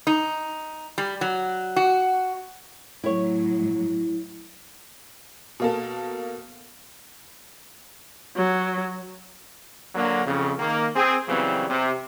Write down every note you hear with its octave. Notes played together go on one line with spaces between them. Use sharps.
D#4
G3
F#3
F#4
A2 F#3 E4 C#5
B2 A#3 A4
F#3
D3 F#3 A#3
F2 C#3
D#3 A#3
C4 G#4
C#3 E3 F#3 G3 B3 C4
C3